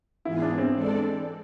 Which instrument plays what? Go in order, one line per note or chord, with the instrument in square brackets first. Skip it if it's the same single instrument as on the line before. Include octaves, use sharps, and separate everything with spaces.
[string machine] G#2 E3 B3 F4 G#4 [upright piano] E4
[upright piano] D4
C4
[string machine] E3 G#3 D4 A4 D5